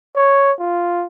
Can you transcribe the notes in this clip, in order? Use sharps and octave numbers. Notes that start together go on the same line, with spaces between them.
C#5
F4